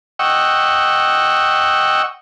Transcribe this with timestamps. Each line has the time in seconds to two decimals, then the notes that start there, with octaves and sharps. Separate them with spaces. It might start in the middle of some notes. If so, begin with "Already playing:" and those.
0.19 D#5 F#5 G5 C#6 E6